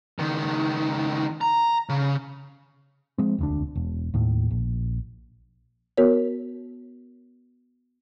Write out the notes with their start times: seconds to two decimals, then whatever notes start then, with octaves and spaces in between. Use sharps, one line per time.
0.19 C#2 D#3
1.41 A#5
1.89 C#3
3.18 F3 G#3 C4
3.39 E1 D2 D4
3.75 E1
4.14 D#2 A2
4.51 A#1
5.97 B3 F#4 A#4 C#5